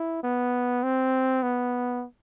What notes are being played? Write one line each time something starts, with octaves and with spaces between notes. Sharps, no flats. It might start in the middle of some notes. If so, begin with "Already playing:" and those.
Already playing: E4
B3
C4
B3